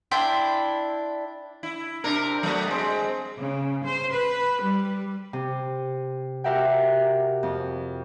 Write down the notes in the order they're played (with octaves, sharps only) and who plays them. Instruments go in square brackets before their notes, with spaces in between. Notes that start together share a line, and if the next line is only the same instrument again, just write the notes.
[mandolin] D4 E4 G5 C6
[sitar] E4
C3 D4 A#4
F#3 A3 B3
G#3 C4
[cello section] C#3
C5
B4
G3
[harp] C3
F#4 G4 A#4 E5 F#5 G5
F2